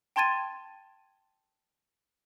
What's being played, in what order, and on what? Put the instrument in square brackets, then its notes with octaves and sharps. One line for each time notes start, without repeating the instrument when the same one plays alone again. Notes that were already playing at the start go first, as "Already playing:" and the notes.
[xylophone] G5 A5 C6 G#6 A6 D#7